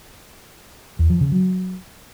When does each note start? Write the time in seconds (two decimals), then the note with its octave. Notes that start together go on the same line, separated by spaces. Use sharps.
0.99 E2
1.10 F3
1.21 C#3
1.32 F#3